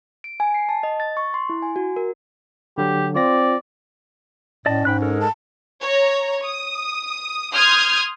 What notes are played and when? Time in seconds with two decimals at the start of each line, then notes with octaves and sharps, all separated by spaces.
0.24 D7
0.40 G#5
0.54 C7
0.69 A5
0.83 D#5
1.00 A6
1.17 C#6
1.34 C6
1.49 E4
1.62 G#5
1.76 F#4
1.96 A#4
2.78 D3 F#3 G4
3.15 C4 F4 D5 A#6
4.66 A2 C#4 D5 D#5 A5
4.85 G#2 G5 B5 F#6
5.02 G#3 A4 A#4
5.20 A5
5.81 C#5 A#5
6.43 D#6
7.53 C6 D#6 F6 G6 G#6